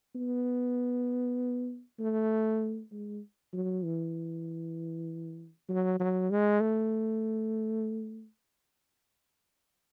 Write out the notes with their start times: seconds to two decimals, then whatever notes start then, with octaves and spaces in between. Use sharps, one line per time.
0.15 B3
1.99 A3
2.92 G#3
3.53 F#3
3.84 E3
5.69 F#3
6.00 F#3
6.30 G#3
6.61 A3